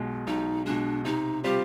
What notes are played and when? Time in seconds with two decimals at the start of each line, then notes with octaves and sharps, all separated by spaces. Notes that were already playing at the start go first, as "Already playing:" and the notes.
Already playing: B1 B2 G#3
0.27 B1 D#4
0.66 B2 G#3 D4
1.05 C3 D#4
1.44 G3 C4 F4 G4